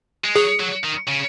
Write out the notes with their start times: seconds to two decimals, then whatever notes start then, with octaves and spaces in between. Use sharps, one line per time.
0.24 G#3
0.36 F#3 G#4
0.60 F#3
0.85 D#3
1.08 C#3